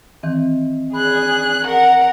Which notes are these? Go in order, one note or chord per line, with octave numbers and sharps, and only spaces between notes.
D#3 E3 C4
G#4 B5 F#6
A#4 F#5